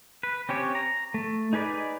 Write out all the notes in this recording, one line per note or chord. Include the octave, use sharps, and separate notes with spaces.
B4
C4 C#4 G4 C#5
A#5
A3
D#4 G#4 B4 D5